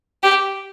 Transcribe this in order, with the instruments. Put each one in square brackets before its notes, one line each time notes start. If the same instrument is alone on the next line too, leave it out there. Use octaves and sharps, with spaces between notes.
[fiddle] G4